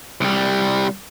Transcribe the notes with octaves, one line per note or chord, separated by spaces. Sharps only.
C2 G3